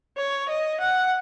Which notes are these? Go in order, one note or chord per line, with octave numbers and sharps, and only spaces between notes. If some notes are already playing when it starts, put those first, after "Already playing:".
C#5
D#5
F#5